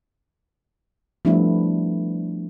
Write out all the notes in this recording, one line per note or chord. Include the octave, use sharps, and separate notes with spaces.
F3 G3 A3 B3 D4 E4